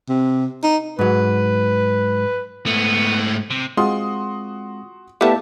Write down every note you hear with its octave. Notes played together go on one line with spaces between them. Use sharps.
C3
D#4
G#2 F#3 B4
G#2 A3 B3
C3
G#3 C4 F4 F#4 C6 D#6
A3 B3 E4 G4 D5 E5 F5 A5